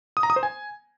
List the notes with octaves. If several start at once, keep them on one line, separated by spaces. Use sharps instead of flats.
D#6
A#5
D#6
C5
G#5